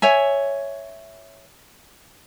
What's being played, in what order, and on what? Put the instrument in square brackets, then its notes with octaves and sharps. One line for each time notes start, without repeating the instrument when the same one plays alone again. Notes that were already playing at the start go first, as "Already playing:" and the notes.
[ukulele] C#5 E5 G#5